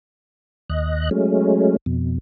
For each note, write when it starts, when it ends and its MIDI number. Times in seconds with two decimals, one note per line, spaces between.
0.70 1.10 39
0.70 1.10 75
0.70 1.10 90
1.11 1.76 54
1.11 1.76 56
1.11 1.76 57
1.11 1.76 61
1.86 2.18 41
1.86 2.18 47